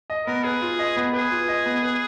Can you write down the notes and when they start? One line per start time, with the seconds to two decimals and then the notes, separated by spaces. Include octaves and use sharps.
0.10 D#5
0.26 B3 A#4
0.44 G#4 B4
0.62 F4
0.79 D#5
0.97 B3
1.13 G#4 B4
1.31 F4
1.48 D#5
1.66 B3
1.83 B4